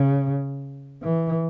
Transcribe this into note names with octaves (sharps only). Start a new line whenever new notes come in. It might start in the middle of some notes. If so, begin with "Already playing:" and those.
Already playing: C#3
E3